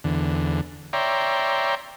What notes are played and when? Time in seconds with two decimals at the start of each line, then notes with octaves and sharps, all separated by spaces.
0.04 E2 D3
0.93 C#5 D5 E5 G5 A#5 C6